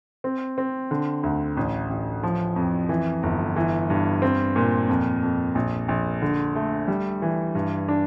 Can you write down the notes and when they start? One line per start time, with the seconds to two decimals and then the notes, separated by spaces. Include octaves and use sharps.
0.24 C4
0.58 C4
0.91 D3
1.23 D2
1.57 A1
1.90 A1
2.23 F3
2.56 F2
2.89 E3
3.23 G1
3.56 E3
3.90 G2
4.22 C4
4.56 A#2
4.88 F2
5.23 F2
5.55 A#1
5.88 A#1
6.22 D3
6.56 A3
6.88 G3
7.22 E3
7.55 G2
7.89 D4